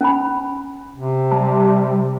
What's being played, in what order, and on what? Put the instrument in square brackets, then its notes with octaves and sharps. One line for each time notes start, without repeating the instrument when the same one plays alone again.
[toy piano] C#4 G#5 B5
[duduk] C3
[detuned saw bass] G3 [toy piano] A5